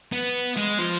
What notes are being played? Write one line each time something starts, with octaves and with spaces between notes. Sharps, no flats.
B3
G#3
F3